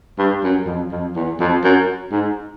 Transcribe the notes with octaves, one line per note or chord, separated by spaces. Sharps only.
G2
F#2
F2
F2
E2
F2
F#2
G#2